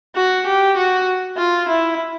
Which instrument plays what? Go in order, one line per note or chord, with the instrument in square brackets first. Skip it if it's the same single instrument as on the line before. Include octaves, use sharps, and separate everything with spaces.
[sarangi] F#4
G4
F#4
F4
E4